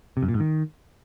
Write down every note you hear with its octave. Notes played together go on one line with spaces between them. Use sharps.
C3
F#2
A#2
G#2
D#3